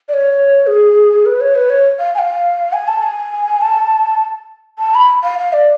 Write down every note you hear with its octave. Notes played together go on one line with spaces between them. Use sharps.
D5
C#5
G#4
B4
C#5
B4
C#5
F5
G#5
F5
G#5
A5
G#5
A5
A5
B5
F5
F5
D5